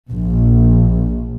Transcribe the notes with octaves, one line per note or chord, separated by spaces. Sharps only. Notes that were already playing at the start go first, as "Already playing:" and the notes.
A#1